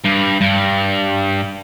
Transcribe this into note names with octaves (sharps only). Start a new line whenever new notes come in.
G2
G2